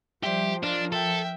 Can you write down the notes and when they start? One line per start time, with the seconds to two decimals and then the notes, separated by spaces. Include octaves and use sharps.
0.23 F3 G3 G4 C5 E5
0.63 D4 F4 A#4 D#5
0.92 A4 E5 G5